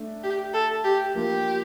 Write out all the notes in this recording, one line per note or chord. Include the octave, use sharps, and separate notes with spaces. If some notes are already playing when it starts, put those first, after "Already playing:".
Already playing: A3 D4
G4
A4
G4
F3 A#3 D4 F4 G4